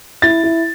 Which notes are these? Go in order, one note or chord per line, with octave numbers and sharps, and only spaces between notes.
E4 A6
E4